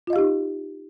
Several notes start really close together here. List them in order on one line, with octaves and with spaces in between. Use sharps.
F4 D#5 F5 G4 D#4